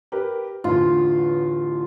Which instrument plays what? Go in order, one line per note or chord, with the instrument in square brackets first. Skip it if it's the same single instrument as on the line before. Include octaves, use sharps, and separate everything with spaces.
[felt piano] G4 A#4 B4
[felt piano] A1 E2 D3 [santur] F4